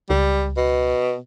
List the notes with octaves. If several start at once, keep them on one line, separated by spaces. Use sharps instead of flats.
C#2 G3
B2